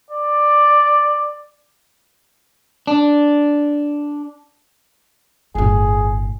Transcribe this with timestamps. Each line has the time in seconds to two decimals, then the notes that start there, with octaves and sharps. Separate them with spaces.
0.11 D5
2.87 D4
5.55 G1 A2 G#4